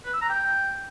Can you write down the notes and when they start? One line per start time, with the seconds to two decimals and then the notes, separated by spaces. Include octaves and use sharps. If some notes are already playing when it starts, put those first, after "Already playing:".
0.05 B4
0.13 E6
0.21 A#5
0.29 G5